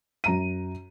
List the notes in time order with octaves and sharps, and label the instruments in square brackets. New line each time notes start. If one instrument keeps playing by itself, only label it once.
[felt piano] F#2 A#5 D#7